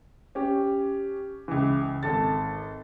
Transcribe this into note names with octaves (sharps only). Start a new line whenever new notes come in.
C#4 G4
C#2 E3
G#1 A4 A6